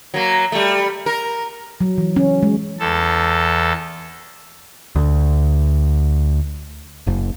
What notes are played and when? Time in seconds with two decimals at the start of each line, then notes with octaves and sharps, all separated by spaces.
0.14 F#3 A#3
0.52 G3 A3
1.06 A#4
1.81 F#3
1.98 E3
2.16 C#4
2.43 G#3
2.79 E2 A4
4.95 D2
7.07 F#1